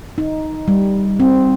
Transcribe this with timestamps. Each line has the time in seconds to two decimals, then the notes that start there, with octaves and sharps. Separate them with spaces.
0.18 D#4
0.68 G3
1.20 C4